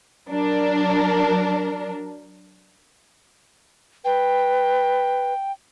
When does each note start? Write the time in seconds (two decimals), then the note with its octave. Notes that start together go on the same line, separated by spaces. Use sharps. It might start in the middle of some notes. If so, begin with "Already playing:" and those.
0.30 F#3 D4 A#4
4.05 B4 G5